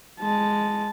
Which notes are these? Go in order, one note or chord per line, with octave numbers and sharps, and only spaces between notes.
G#3 A5